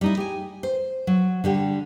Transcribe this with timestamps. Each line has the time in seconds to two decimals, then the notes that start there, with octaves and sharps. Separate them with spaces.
0.01 G3 D#4 E4
0.17 G4 G#5
0.63 C5
1.07 F#3
1.44 D3 G3 G4